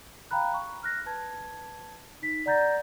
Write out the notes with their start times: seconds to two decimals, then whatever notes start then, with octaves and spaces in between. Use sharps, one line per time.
0.31 F5 G5 A#5 B5 F#6
0.54 C#6
0.83 F6 F#6 A#6
1.06 B4 A5 G#6
2.22 D#4 B6
2.46 D5 F#5 A#5 G6 A6 A#6